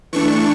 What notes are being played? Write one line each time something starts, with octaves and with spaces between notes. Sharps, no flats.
E3 A3 D4 C#6